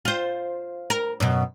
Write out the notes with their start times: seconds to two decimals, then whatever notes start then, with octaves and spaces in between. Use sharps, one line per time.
0.05 F4 C5
0.90 A#4
1.20 F#2 B2